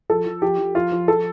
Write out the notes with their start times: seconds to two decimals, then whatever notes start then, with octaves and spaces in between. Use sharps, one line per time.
0.10 F3 A4
0.26 F3
0.42 F3 G4
0.58 F3
0.75 F3 F4
0.92 F3
1.08 F3 A4